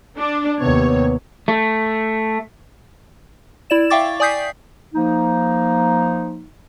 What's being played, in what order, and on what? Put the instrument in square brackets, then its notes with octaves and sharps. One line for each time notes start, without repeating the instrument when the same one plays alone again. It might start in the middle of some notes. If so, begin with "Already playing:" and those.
[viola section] D4
[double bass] D#2 C3 [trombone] B3 [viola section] C#5
[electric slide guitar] A3
[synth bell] E4 D5 E7
E5 F5 G5 C#6 D6 A6
D5 G#5 D#6 G6 B6 C7
[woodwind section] F3 A#3 D#4